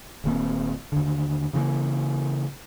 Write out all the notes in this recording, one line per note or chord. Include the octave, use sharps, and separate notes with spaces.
D#1 D#3 A#3 C4
D#2 D3
C#3 E3 G3 A#3